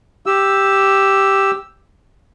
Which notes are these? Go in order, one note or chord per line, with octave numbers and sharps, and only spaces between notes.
G4 E6